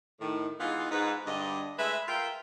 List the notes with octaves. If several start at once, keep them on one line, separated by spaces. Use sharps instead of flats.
A2 D#3
E3 G#3 B3 D#4 F4
G#2 D#4 B4
G2 D3 D#5
G#3 A3 B4 E5
F4 A#4 E5 F5 G5